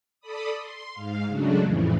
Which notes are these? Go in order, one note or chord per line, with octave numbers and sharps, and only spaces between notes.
A4 D5 B5 D#6
C6
G#2 F5
C#3 F#3 G#3 A3 D4 F#4
F2 A2 C#3 E3